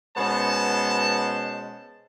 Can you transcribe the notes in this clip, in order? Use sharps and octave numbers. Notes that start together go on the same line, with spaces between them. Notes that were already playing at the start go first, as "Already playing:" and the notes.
B2 G#3 B3 C#4 C5 A5